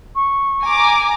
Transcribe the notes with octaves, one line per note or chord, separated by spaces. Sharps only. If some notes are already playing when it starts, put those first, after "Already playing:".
C#6
G#5 A#5 D6